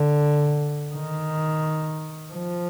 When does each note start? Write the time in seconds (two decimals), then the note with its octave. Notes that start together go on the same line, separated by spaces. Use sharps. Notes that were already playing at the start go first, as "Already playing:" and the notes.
Already playing: D3
0.92 D#3
2.33 F3